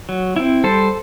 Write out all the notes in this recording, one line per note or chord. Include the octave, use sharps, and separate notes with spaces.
F#3
C4 E4
G3 A4 C5